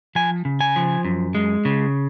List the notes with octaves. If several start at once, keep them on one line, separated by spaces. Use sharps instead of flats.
F3 G#5
C#3
G#5
F3
F#2
G#3
C#3